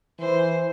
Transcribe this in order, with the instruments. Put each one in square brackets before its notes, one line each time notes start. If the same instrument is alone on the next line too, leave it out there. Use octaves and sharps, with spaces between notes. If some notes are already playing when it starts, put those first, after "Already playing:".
[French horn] E3 [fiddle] C5